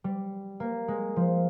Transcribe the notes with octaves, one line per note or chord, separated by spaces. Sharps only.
G3
A#3
G#3
F3